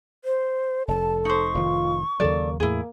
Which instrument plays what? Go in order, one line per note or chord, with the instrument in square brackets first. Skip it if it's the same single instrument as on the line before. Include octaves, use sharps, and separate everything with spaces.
[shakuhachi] C5
[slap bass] F1 [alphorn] A4 [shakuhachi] A5
[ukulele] D#4 C5 [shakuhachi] C#6
[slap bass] F1 A2 D#3 [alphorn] F4
[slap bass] D#2 C#3 F#3 [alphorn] A#3 [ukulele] A4 D5
[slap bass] E2 A2 [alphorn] A#3 [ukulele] E4 G#4